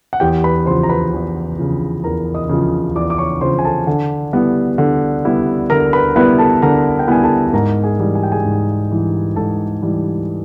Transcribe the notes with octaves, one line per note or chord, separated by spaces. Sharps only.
F#5
E2 G4 G5
B4 B5
C#3 F3 C5 C6
A#5
B4 B5
E2
C#3 F3
E2 A#4 A#5
D#5 D#6
C#3 F3
E2 D5 D6
D6
C#5 C#6
C#3 F3 C5 C6
G#5
A4 A5
D3
G3 B3 E4
D3
G3 B3 E4
D3 A#4 A#5
B4 B5
G3 B3 E4 B4 B5
A4 A5
D3 A#4 A#5
G5
G3 B3 E4 G#5
A4 A5
G#2 A#4 A#5
G#4 G#5
E3 G3
G#5
G5
G#4 G#5
G#2
E3 G3
G#2 A4 A5
E3 G3